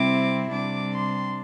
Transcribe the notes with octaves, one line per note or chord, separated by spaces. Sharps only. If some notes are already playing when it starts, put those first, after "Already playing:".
Already playing: C3 G3 C4 E4 D6
C3 G3 D4 D6
C6